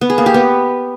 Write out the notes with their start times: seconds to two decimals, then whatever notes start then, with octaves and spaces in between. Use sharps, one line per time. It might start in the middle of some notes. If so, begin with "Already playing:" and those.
0.01 B3
0.10 G#4
0.18 A#3
0.26 G4
0.34 B3